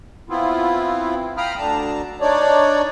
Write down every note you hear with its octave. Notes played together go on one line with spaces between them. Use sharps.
B3 C4 E4 F4
F5 G5 A#5 B5 D#6 F6
D2 D3 D4 A5 A#5
D4 D#4 C#5 D5